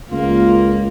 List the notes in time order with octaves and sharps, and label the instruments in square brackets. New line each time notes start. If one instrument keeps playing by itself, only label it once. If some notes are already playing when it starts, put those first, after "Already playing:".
[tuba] C#2 [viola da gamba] A#3 [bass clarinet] F4